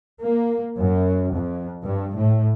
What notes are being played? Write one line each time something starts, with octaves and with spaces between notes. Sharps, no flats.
A#3
F#2
F2
G2
A2